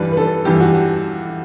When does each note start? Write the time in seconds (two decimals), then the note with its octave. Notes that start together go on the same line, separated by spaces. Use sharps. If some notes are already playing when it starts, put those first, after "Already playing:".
Already playing: G2 E3 G3 B4
0.12 B4
0.17 A4
0.45 G2 E3 G3 G4
0.60 F#4